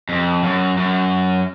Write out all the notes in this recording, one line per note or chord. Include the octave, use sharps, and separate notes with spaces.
F2
F#2
F#2